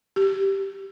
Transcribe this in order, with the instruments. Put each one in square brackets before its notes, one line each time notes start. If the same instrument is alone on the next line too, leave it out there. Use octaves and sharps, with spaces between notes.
[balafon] G4